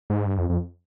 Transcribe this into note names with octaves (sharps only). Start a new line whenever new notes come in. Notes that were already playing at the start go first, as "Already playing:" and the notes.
G#2
G2
F2
F2